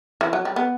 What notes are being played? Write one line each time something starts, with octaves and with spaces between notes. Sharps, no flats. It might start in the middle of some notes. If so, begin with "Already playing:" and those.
E3
F#3
G3
B3